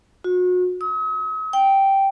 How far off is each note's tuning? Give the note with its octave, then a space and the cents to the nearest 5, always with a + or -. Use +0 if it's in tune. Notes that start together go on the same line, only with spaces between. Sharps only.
F#4 -35
D#6 +45
G5 -5